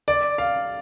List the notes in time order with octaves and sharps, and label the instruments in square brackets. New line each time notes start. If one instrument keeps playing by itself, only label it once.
[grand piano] D5
F5